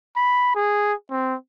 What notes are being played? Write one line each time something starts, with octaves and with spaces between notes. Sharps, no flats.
B5
G#4
C4